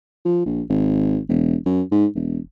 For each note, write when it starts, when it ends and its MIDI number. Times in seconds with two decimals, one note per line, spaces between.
0.25 0.42 53
0.46 0.61 34
0.69 1.18 32
1.29 1.56 28
1.66 1.82 42
1.91 2.06 44
2.15 2.38 28